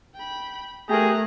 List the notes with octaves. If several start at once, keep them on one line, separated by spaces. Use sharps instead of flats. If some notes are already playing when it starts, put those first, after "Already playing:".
G5 B5
A3 G4 G#4 A#4 A#5 F#6